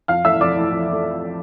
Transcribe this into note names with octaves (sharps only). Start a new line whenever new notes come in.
F2 F5 F6
E3 A3 E5 E6
F2 D5 D6
E3 A3
F2
E3 A3